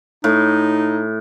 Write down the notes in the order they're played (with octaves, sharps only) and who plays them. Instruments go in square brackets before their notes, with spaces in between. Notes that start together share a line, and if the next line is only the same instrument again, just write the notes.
[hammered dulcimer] A2 [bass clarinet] D#4